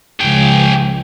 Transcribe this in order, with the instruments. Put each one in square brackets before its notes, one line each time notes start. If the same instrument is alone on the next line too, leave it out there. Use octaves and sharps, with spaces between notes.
[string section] C#2 F3 [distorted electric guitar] G#4 G5